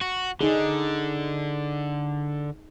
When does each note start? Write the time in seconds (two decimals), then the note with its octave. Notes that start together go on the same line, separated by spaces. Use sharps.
0.01 F#4
0.41 D3 D#4 G#4